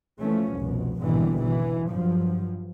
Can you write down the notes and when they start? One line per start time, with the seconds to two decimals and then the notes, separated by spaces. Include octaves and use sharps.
0.20 E3 F3 A3 C#4
0.56 F1 C2 B2
1.02 G#1 E2 B2 D3 E3 G3
1.42 B2 E3
1.90 G2 F3 F#3